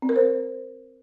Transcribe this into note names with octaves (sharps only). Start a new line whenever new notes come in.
C4
A#4
C5